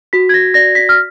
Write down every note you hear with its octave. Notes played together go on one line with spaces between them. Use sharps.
F#4 B6
G#6
A#6
D5 A#6
B6
F6